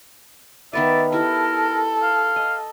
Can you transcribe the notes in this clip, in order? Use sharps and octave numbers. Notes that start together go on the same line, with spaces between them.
D#3 B3 B4 D5 E5
E4 G4 A4 A#4
F5
D#5